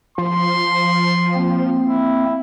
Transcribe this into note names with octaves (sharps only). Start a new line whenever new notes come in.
F3 C6
A#3 C4
E4